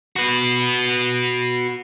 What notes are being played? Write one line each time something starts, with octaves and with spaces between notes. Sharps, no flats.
F#4 B4